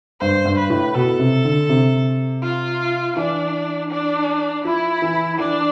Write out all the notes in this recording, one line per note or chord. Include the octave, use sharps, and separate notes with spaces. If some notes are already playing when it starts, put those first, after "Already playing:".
G2 C5
G2
B4
A2
B2 A4
C3
D3
C3
F4
E3 D4
D4
F3 E4
E3
E3 D4